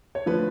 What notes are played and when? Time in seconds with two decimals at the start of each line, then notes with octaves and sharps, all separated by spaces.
0.15 C#5
0.26 D3 F3 A3 B4